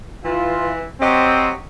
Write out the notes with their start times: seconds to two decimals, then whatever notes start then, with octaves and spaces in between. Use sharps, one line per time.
0.25 E3 F4
1.01 F#3 C4 G4 D#5